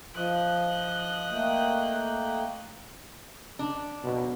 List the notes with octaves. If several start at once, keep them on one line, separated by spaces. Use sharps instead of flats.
F3 D#5 F#6
A3 A#3 G5
D4
B2